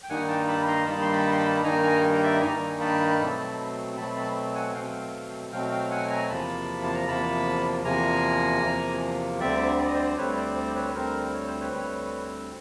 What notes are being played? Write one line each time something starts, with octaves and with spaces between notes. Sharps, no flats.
G5
G2 D#3 G3 A#3 D#4 F#5 G#5
G5 A5
A5 B5
A#5 C6
G2 D#3 G3 A#3 D#4 A5 B5
C6
A5 B5
C6
A5 B5
G2 D#3 G3 A#3 D#4 G#5 A#5
G#5 A#5
D5 E5
G2 D#3 G3 A#3 D#4 G#5 A#5
A5 B5
B2 F#3 A3 C4
B2 F#3 A3 C4 A5 B5
A5 B5
F#5 G#5
B2 F#3 A3 C4 F5 G5
B2 F#3 A3 C4 F5 G5
F5 G5
F#5 G#5
G#5 A#5
E2 C3 F3 A#3 A5 B5
A5
A#5
E2 C3 F3 A#3 A5 B5
E2 C3 F3 A#3 G#5 A#5
E2 C3 F3 A#3
D2 D3 G3 C4 D5 E5
D5
D#5
C5 D5
C5
D2 D3 G3 C4 B4 C#5
C5 D5
C5 D5
B4 C#5
D2 D3 G3 C4 A#4 C5
C#5
C5
B4 C#5
D2 D3 G3 C4